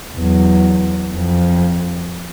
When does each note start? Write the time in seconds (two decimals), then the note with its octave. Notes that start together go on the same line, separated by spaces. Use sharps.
0.17 E2 F#3
1.13 F2